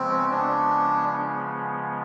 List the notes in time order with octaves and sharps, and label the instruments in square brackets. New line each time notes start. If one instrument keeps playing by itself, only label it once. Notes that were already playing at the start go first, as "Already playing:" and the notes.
Already playing: [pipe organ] C#3 F3 G#3 B3 [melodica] C4
[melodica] D4